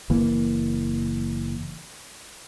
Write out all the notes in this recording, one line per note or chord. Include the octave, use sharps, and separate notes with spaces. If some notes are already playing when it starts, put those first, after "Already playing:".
F#1 E3 A#3